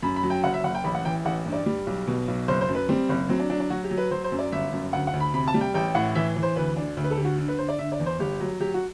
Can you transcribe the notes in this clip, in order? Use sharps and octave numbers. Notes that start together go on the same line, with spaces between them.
F#2 B5
B5
F#3
G5
F#1 F#5
E5
F#1 F#5
G5
A1 B5
F#5
E3 G5
A1 F#5
G2
D5
G3
B1
B2
B1
F#1 C5
C5
F#2
B4
G3 C4
F#1
F#3 C4
D4
F#3 D4
D4
F#3 F#4
G4
F#3
B4
F#3 C5
C5
F#2
D5
G1 E5
F#2
D2 F#5
F#5
D2
B5
C3 B5
A5
G3
G5
A1 G5
A2 F#5
E3 E5
E3
C5
D2 B4
D3 D4
D2
B4
A4
D3 G4
F#4
D3
B4
D3 C5
D5
D3 E5
D5
E2
C5
G1 G4
F#3
F#3 G4
F#4